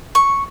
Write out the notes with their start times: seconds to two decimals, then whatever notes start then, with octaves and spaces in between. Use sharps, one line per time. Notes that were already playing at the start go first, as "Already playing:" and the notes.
0.15 C#6